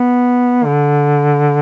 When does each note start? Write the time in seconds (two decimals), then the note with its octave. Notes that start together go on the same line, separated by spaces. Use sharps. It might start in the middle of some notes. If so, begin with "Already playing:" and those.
Already playing: B3
0.66 D3